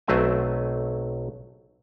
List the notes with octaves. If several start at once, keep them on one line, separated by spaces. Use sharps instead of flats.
B1 F#3 A3 C4 E5 G#5